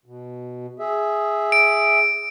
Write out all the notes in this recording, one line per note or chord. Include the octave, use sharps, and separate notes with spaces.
B2
G#4 E5
D7